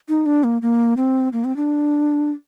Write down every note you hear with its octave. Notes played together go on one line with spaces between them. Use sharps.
D#4
D4
A#3
A#3
C4
A#3
C4
D4